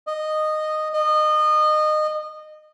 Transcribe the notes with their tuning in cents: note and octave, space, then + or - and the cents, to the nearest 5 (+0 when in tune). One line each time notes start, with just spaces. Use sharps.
D#5 -10
D#5 -25